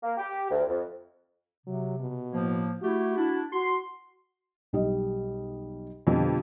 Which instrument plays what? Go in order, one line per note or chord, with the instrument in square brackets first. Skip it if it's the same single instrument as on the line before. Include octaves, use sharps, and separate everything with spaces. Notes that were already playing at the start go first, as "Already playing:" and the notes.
[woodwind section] A#3
G4
D2
F2
[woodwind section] C3 [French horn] F#3
[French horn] B2
[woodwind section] A2 F3 A#3
[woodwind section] A3 E4 G4 [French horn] F#4
[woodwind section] D4 E4
[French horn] F#4 [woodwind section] C6
[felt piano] B1 G3 D#5
[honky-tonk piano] F2 [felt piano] B2 D3 G3